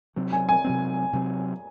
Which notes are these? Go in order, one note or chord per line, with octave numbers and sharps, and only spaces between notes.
C3 F#3 C4
G#5
G#5
C3 F#3 C4
C3 F#3 C4